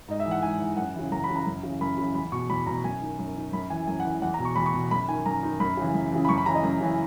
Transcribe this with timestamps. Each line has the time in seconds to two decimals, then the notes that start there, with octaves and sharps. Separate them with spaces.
0.08 G#2 D#5
0.20 E5
0.26 E3
0.31 F#5
0.42 G#2 G#5
0.59 E3
0.77 F#2 F#5
0.94 C#3 E3
1.11 F#2 A#5
1.24 B5
1.29 C#3 E3
1.36 A#5
1.46 F#2
1.63 C#3 E3
1.81 F#2 B5
1.98 C#3 B5
2.01 E3
2.15 E2 B5
2.32 B2 C#6
2.49 E2 B5
2.66 B2 A#5
2.84 F#2 G#5
3.01 D#3
3.19 F#2
3.36 D#3
3.53 F#2 B5
3.70 E3 G#5
3.87 F#2 G#5
4.00 F#5
4.05 E3
4.22 E2 F#5
4.34 A#5
4.39 B2
4.45 C#6
4.56 E2 B5
4.66 C#6
4.74 B2
4.91 F#2 B5
5.08 D#3 G#5
5.26 F#2 A#5
5.43 D#3
5.60 F#2 B5
5.77 C#3 E3
5.94 F#2
6.12 C#3 E3
6.25 B5
6.29 F#2 C#6
6.38 B5
6.46 C#3 E3 A#5
6.55 D#5
6.63 F#2
6.81 C#3 E3